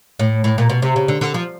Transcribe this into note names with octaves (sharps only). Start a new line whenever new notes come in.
A2
A2
A#2
B2
C3
C#3
D3
D3
F3